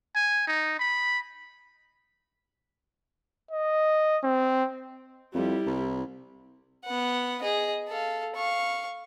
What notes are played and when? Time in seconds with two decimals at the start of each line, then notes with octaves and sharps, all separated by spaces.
0.16 G#5
0.48 D#4
0.79 B5
3.51 D#5
4.24 C4
5.34 F2 G3 E4
5.66 C2
6.85 B3 F#5
7.42 G#4 D#5
7.88 A4 F5
8.36 F5 C#6